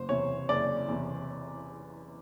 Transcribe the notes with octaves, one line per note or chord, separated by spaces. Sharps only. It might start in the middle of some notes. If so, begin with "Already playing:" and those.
Already playing: F#1 C5
E2 C3 C#5
F#1 D5
E2 C3